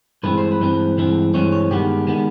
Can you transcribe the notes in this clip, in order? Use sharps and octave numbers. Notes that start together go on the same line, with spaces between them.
G2 E3 G#3 C4 B4
C5
B4
G2 E3 G#3 C4
G2 E3 G#3 C4
G2 E3 G#3 C4 C#5
C#5
G2 D#3 G#3 B3 G4
D#3 G#3 B3